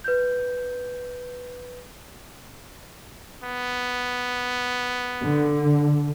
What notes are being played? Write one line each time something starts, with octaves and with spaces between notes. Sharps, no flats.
B4 G6
B3
D3